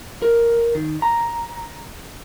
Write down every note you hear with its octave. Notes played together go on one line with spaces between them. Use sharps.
A#4
D#3
A#5